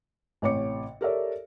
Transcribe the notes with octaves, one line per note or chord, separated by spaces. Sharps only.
A1 C3 C#5 G5 D6 C#7
G4 A4 A#4 C#5 D5 E5